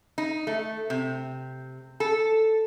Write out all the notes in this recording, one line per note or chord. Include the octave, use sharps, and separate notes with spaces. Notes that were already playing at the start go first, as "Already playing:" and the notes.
D#4
A3
C3
A4